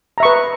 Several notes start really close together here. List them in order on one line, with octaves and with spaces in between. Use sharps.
A#5 E5 C#6 B4